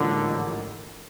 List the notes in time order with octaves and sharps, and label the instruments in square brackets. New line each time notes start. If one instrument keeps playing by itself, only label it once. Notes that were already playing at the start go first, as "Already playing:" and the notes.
Already playing: [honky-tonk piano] A1 G#2 F3 A#3 D#4 [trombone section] D3